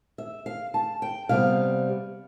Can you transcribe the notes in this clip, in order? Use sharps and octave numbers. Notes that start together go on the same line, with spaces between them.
E5
F5
A5
G5
C3 G3 B3 F5